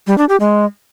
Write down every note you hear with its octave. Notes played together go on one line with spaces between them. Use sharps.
G3
D4
G4
G#3